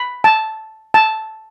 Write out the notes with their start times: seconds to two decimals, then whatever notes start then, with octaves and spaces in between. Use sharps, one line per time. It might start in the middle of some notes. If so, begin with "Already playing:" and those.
Already playing: B5
0.24 A5
0.94 A5